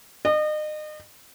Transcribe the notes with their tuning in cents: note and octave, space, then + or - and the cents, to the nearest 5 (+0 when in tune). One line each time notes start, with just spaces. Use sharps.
D#5 -35